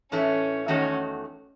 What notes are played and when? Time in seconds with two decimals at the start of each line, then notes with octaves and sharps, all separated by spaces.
0.12 A2 E3 A3 C#4
0.68 E2 D#3 A3 C#4 D#4 F#4